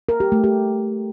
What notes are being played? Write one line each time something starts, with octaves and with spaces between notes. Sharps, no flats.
A#4
G4
A3
G4